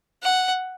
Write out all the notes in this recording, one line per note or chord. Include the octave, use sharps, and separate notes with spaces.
F#5